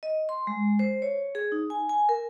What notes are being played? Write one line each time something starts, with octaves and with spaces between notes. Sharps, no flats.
D#5
C6
G#3
C5
C#5
G#4
D#4
G#5
G#5
A#4